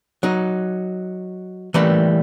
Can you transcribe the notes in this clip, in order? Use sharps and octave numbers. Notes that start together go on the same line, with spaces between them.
F#3 D#4
E3 G3 A3 A#3 A4 B4